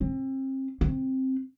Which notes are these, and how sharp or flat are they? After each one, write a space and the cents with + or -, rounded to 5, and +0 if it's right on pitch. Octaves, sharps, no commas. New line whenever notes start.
C4 +30
C4 +10